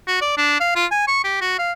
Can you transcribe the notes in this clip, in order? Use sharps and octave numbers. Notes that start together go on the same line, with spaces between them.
F#4
D5
D4
F5
F4
G#5
C#6
G4
F#4
F5